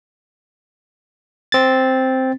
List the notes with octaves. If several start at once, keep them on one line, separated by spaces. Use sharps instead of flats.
C4 A6